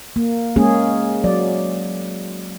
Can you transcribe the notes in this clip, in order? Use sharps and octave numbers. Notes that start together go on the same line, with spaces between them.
A#3
G#3 A#3 C#4 G#4
F#3 D5